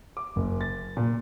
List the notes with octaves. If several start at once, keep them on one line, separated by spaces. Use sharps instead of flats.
D6
F#1
A6
A#2